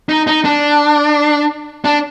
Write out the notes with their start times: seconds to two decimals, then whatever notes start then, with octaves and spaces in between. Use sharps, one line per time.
0.09 D#4
0.27 D#4
0.44 D4
1.85 D4